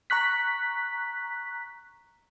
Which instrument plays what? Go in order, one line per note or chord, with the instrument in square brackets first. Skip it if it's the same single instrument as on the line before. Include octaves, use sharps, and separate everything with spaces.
[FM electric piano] A#5 C#6 F#6 B6